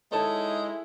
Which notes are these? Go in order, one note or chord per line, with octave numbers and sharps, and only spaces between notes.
G#3 D#4 E4 A4 C#5 A5